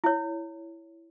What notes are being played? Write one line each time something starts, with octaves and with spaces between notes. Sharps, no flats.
E4 C#5